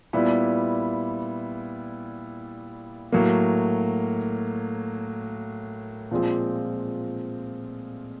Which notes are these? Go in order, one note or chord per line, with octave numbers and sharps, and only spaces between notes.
A#2 G3 B3 E4
A2 F#3 A#3
A#2 F3 G#3 C4